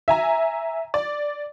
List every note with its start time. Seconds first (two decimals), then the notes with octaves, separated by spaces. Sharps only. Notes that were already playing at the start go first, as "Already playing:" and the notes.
0.08 E5 G#5 A#5
0.94 D5